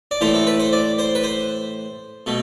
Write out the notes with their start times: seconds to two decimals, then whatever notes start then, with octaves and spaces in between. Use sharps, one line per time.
0.11 D5
0.21 A2 E3 A3 C5
0.34 A4
0.47 B4
0.60 C5
0.73 D5
0.99 C5
1.15 B4
1.24 C5
2.26 B2 A3